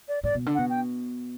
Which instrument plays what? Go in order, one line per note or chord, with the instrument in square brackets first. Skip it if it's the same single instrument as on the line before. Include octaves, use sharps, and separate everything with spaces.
[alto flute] D5
[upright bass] A2 [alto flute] D5
[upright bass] B2
D3
[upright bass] B2 [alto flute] F#5
[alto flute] G5